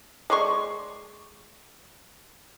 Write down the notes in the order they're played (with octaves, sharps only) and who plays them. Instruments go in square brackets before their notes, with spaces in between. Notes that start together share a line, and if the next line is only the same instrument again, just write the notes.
[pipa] G#3 D5 C6 C#6